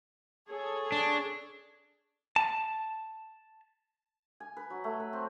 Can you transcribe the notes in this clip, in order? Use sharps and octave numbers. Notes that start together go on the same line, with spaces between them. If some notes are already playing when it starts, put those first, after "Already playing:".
G#4 A4 C#5
D4
A5
G#5
B4
F#3
A3
B4
C4